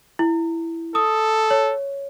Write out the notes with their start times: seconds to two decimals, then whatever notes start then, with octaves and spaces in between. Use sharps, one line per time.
0.19 E4
0.95 A4 D#6
1.51 C#5